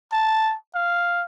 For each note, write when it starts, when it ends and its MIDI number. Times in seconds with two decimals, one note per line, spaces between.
0.12 0.55 81
0.75 1.24 77